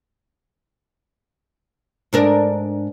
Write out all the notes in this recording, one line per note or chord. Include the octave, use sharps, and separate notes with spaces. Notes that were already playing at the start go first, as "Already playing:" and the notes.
G#2 D4 A#4